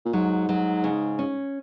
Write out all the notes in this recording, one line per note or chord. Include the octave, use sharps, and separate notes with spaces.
A#2
G#2 F#3
F#3
C#3
C#4